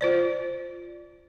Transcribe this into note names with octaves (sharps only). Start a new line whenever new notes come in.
F4 C5 D5